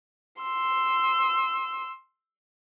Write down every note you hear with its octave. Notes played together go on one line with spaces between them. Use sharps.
C6 E6